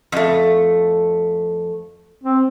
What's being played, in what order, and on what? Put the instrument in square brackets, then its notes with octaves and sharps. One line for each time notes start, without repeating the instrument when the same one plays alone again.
[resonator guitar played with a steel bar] F2 A3
[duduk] C4